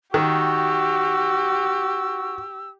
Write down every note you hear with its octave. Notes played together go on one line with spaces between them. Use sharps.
D#3 F#4 G4 E6